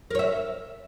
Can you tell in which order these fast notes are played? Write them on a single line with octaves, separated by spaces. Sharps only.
A#4 C#5 E5